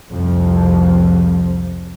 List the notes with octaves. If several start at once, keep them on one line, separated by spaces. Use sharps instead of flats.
C2 F2 F3